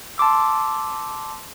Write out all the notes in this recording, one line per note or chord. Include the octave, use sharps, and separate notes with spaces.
A5 C6 D6 E6